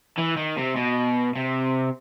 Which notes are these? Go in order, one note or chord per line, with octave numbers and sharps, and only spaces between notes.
E3
D#3
C3
B2
C3